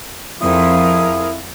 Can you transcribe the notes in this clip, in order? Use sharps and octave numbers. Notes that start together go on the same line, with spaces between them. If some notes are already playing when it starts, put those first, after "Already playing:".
F2 E4 G#4 A#4 D#6